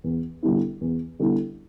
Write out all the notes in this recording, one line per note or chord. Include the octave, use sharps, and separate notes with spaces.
E2
D3 G3 B3 E4
E2
D3 G3 B3 E4